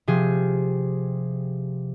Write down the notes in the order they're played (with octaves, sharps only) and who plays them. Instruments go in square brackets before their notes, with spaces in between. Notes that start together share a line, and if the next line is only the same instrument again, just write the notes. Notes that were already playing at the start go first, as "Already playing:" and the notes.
[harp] C3 F3 G4 G#4